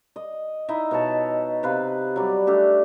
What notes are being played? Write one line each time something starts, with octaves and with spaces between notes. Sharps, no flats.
D#5
D#4 E4 D#5 E5
B2 C#5 A5
C3 B4 F5
F#3 G3 D5
A3 D4 G4 A4